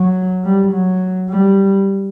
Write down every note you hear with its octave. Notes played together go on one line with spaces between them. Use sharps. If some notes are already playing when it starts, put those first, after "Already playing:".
Already playing: F#3
G3
F#3
G3